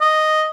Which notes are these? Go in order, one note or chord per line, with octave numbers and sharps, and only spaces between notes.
D#5